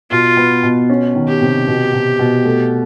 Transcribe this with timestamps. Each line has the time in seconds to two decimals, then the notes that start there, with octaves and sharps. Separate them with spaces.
0.10 B2 F4
0.37 B3
0.63 B2
0.90 C#4
1.15 D#3
1.28 G4
1.42 C3
1.68 B2
1.93 B2
2.19 B2
2.45 A3